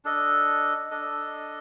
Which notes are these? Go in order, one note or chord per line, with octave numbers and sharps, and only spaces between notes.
D4 A4 D#5
D4 A4 D#5